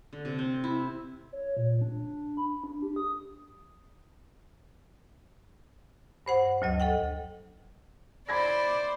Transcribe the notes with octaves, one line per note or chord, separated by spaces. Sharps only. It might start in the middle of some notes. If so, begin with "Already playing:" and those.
D3
C3
C4
E4
C#5
A#2
D4
B5
D4
G4
D#6
G2 C5 F#5
D2 F#3 D#5
A4 D#5 F#5 G5
E4 C5 D5 B5 D6 G#6 A#6